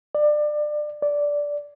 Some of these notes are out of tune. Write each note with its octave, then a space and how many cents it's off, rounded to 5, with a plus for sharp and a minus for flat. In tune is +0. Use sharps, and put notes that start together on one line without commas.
D5 +25
D5 -10